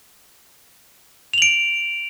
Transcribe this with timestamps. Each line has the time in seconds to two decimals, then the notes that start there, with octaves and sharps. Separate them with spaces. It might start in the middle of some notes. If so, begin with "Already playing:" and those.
1.34 F7
1.38 F#7
1.42 D7